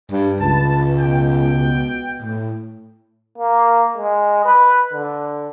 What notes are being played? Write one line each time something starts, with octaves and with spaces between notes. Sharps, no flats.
G2
C#2 B4 A5
B2 G5
A2
A#3
G#3
B4
D3